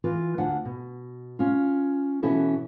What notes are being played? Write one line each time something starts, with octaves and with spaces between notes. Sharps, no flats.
E3 F4 B4
D2 D4 F#5 G#5
B2
C#4 F4
B2 E3 C#4 E4 F#4 A4